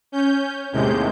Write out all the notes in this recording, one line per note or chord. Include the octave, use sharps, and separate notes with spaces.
C#4 G6
D#2 A2 C3 G#3 G6